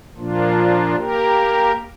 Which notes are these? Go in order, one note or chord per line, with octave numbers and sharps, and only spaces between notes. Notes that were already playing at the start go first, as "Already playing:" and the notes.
A#2 F3 A#3 D4 F4
A#3 G4 A#4